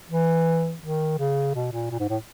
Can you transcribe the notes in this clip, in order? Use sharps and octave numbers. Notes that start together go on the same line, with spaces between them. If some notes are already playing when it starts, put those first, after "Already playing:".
E3
D#3
C#3
B2
A#2
A#2
G#2
A2